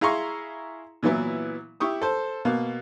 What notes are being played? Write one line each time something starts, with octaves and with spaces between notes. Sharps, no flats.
E4 G#4 F5 A#5 C6 C#6
A#2 E3 F#3 B3 E4
E4 G4 C#6 D#6
A4 C5
B2 A#3